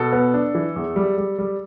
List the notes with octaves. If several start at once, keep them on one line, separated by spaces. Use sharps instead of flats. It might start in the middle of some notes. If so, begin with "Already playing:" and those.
Already playing: B2 A4
B3
D4
E3
E2
G3
G3
G3